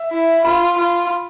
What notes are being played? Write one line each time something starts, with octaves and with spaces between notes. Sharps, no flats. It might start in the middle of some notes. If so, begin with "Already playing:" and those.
Already playing: E5
E4
F4 B5
F4